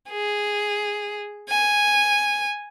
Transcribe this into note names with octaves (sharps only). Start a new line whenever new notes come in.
G#4
G#5